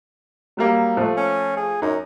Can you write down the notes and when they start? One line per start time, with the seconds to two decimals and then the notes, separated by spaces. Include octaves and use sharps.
0.57 F#3 G3 A#3
0.97 F3 A3
1.17 C#4
1.57 G#4
1.82 F#2 D#4